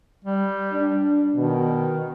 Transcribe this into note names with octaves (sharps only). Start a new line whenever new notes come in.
G3
D4
B2 D#3